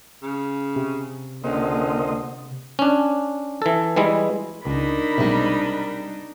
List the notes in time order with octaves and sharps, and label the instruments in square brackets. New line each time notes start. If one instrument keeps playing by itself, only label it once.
[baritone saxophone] C#3
[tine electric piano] C3
[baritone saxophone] C#2 [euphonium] D3 [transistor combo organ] A#3 C5 D#5
[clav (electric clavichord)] C#4 D4
E3 A4
E3 G3 G#3 E4
[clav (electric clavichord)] C#2 [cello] D4 D#4 [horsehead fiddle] A#4 B5
[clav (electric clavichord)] B1 C3 [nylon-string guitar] G3 G#3 C4